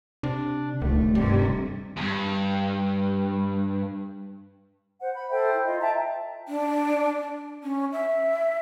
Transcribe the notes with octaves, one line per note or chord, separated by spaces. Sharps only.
C3 D4
D#1 C#2 A3
G2 C3 G3
E2 G2
C5 F#5
B5
A4 C5 E5 G5
E4
F4 D#5
E5 G5 A5 A#5
D4
C#4
E5